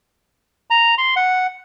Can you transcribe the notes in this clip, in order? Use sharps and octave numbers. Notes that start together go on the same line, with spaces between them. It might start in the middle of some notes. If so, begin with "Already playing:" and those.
A#5
C6
F#5